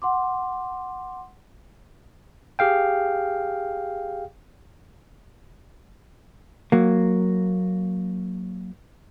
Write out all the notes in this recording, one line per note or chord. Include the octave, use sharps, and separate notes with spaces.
F#5 C6 D6
G4 G#4 F5 G5
F#3 A#3